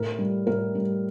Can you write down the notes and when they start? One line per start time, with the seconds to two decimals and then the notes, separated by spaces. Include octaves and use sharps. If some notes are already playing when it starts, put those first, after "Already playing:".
Already playing: A2 A#4
0.19 G3
0.47 A2 A#4
0.75 G3